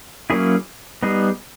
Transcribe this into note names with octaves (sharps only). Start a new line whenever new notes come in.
F#3 A#3 C#4 E4 G#4
G3 B3 D#4 G#4